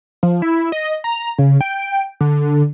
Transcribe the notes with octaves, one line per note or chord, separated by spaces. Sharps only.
F3
E4
D#5
A#5
C#3
G5
D3